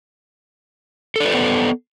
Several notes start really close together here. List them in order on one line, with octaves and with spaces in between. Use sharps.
A4 D5 B4 C5 B3